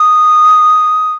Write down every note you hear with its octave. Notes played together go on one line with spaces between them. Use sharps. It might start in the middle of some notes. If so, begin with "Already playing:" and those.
Already playing: D#6